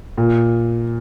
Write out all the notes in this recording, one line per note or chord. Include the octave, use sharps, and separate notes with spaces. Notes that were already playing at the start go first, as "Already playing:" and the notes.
A#2